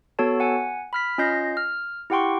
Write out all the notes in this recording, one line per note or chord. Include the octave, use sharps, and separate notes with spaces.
B3 F#4 A4 C#5 A5
F#5 G#5
B5 F6 B6
C#4 F4 D#5 G6 A#6 C7
F6
E4 G4 F#5 G5 C6 C#6